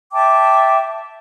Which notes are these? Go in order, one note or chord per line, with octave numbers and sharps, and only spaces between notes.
E5 G5 A5 D6